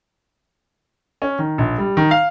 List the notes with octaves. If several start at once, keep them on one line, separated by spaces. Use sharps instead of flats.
C#4
D#3
A#1
G3
D#3
F5